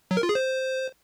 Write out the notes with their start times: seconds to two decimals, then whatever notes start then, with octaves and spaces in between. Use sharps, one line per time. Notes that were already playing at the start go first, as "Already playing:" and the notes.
0.11 F#3
0.17 A#4
0.23 F4
0.29 G#4
0.35 C5